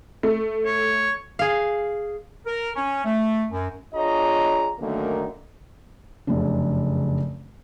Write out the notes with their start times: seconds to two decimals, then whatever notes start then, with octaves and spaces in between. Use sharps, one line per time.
0.23 A3
0.66 C#5
1.39 G#4 F5
2.47 A#4
2.76 C#4
3.05 A3
3.51 F#2
3.94 D4 F4 G#4 C#5 D#5 A#5
4.80 F#2 D3 D#3 A3 A#3
6.27 F1 F#2 C#3 D4